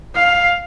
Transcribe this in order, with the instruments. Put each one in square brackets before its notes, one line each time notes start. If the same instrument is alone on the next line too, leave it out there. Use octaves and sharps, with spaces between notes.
[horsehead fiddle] F5